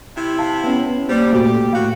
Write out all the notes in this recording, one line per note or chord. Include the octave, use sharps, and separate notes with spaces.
C3 E4
F5 A5
B3 C#4
G3 A#3 C5
A#2 A3 F#4 G4
A2 F#4 F5